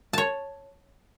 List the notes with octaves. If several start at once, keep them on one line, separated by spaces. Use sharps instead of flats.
C#5 A5